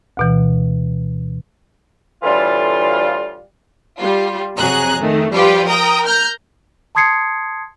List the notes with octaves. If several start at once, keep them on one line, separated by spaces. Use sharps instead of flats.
D2 B2 E3
D2 A2 E3 G3 F4
G3 F4
F2 C3 F#3 G#4 A#5 F#6
D#3 A3
F3 G3 F4 G4 B4
A#4 G5 A#5 D#6
A#5 F6 G6
A5 C6 D#6 G#6 C7 C#7